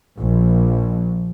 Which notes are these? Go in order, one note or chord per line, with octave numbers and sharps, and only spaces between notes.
A#1